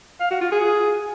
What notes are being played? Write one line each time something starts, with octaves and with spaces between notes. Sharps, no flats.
F5
F#4
F4
G#4